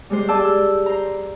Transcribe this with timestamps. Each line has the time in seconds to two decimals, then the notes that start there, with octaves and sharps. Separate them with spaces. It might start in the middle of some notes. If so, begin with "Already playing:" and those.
0.10 G3 G#3 C5
0.28 G4 G#4 D5 G5 A5 E6
0.44 E6
0.86 C5 A#5